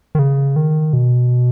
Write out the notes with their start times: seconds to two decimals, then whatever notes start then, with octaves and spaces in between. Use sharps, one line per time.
0.15 D#3
0.19 C#3
0.56 D#3
0.93 B2